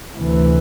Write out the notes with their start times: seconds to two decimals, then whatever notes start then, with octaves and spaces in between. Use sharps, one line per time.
0.16 D2 C3 E3